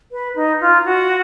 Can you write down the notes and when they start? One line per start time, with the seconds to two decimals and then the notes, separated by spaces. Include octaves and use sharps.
0.12 B4
0.36 D#4
0.61 F4
0.85 F#4